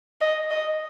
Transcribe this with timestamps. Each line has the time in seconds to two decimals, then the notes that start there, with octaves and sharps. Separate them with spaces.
0.21 D#5
0.51 D#5